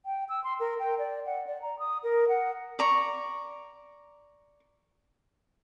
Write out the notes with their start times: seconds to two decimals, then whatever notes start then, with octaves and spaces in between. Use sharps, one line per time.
0.06 G5
0.29 E6
0.44 C6
0.60 A#4
0.79 G5
0.99 D5
1.26 F#5
1.47 D5
1.62 A#5
1.79 D#6
2.03 A#4
2.28 F#5
2.79 D5 A#5 C#6